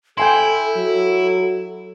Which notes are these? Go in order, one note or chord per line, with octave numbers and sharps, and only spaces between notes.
E4 A4 G5 G#5 C6
F#3